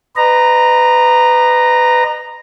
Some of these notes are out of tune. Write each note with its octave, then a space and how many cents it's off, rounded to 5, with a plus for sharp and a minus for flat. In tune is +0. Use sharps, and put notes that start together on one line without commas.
B4 +25 D#5 -35 A#5 +0